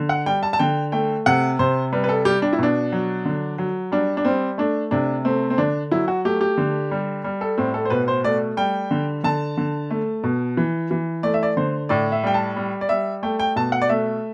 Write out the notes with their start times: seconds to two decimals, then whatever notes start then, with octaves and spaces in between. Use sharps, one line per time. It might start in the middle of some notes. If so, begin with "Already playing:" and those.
Already playing: D3
0.09 F#5
0.26 G3 G5
0.43 A5
0.53 A5
0.59 D3 G5
0.92 A3 G5
1.26 C3 F#5
1.59 C3 C5
1.93 G3 B4
2.04 B4
2.09 A4
2.25 G3 G4
2.42 D4
2.53 E4
2.59 B2 D4
2.92 F#3
3.25 D3
3.58 F#3
3.92 G3 D4
4.17 D4
4.25 G3 C4
4.58 A3 D4
4.91 C3 D4
5.25 A3 C4
5.50 C4
5.58 D3 D4
5.91 F#3 E4
6.08 F#4
6.25 A3 G4
6.41 G4
6.58 D3
6.91 G3
7.24 G3
7.41 A4
7.58 A2 C4
7.74 A4
7.85 C5
7.90 B2 B4
8.08 C5
8.24 A3 D5
8.57 G3 G5
8.91 D3
9.24 D3 A5
9.57 D3
9.90 A3
10.24 B2
10.57 E3
10.91 E3
11.23 A3 D5
11.34 E5
11.43 D5
11.57 D3 C5
11.89 A2 D5
12.12 E5
12.23 G3 G5
12.34 A5
12.56 G3
12.81 D5
12.89 G3 E5
13.23 A3 G5
13.39 G5
13.56 B2 A5
13.72 F#5
13.82 D5
13.89 A3 E5